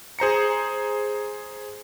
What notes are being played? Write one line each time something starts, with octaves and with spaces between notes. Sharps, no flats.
G#4 C5 A#5 C#7